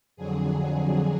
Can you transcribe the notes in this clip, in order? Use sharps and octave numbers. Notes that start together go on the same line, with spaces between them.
F2 D3 F#3 G#4
G#4